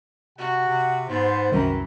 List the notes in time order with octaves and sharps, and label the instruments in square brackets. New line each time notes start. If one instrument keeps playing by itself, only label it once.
[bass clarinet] C3 [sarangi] F#4 [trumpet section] F#5
[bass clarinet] C3
[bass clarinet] G#2 [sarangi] B3 [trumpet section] C5
[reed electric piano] C2 F#2 A#5 [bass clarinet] D#3 [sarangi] E3